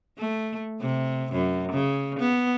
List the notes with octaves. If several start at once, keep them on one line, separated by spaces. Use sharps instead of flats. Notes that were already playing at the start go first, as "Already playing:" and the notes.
A3
C3
F#2
C#3
B3